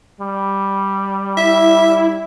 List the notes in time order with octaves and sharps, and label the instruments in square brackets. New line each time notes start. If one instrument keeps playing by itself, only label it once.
[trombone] G3
[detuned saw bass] E4 [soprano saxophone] E5